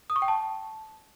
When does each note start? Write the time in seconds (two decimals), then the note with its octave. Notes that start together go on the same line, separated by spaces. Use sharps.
0.10 D#6
0.16 C#6
0.22 G5
0.28 A5